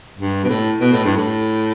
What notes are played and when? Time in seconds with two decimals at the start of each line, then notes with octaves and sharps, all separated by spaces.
0.18 G2
0.44 B2
0.49 A2
0.80 B2
0.93 A2
1.05 G2
1.16 A2